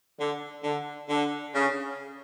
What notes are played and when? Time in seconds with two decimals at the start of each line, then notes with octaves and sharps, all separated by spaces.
0.19 D3
0.64 D3
1.09 D3
1.54 C#3